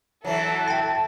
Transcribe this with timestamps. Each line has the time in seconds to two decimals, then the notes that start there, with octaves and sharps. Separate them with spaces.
0.25 E3 F#3 A4 E5
0.68 G5 A5